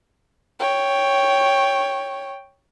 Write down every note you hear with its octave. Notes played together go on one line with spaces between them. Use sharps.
C#5 G5